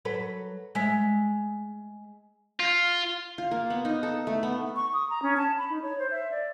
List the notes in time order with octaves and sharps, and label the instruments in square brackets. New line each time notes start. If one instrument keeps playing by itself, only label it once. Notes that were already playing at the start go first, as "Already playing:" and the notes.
[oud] F#3 A4 B4
G#3 E5
[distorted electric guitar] F4
[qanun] F4
A#3
B3
D#4
A4
A3
B3
[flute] C#6
D#6
A#5
C#4
A5
B5
D#4
C#5
C5
E5
D5